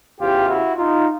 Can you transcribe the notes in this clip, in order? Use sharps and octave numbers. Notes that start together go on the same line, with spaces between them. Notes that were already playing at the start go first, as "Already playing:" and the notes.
E2 C#3 E3 F4 G4
E4 F#4
D#4 F4